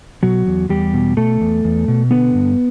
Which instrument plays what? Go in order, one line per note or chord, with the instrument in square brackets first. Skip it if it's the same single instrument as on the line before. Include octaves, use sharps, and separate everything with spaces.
[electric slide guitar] B2 F#3 F#4
E2
E2 G3 G4
B2
B2 A3 A4
E2
E2
B2
D3 B3 B4
G2